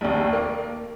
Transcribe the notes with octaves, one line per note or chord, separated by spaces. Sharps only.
A#1 D#2
A#3